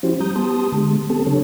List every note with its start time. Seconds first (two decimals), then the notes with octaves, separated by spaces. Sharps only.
0.03 F3 C#4 E4 F#4 G4 C5
0.20 G3 A#5 D#6 G6
0.36 B3 G4 A5 C6 D#6
0.72 D3 G#3
1.10 B3 C4 G4 A4 A5
1.26 C#3 F#3 D4 A4 C#5